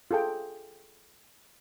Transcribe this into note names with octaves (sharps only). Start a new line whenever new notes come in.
F4 G#4 A4 G5